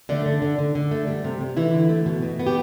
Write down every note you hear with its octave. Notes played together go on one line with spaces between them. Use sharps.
D3 A3 D4
D3
D3
D3
D3
A3
G3
C3
C3
D3 E3 E4
D3
A3
B2
B2
B3
G4